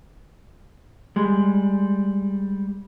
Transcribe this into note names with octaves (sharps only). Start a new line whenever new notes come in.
G3 G#3